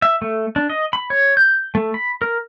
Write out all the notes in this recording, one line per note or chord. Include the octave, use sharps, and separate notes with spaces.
E5
A3
D4
D#5
B5
C#5
G6
A3
B5
A#4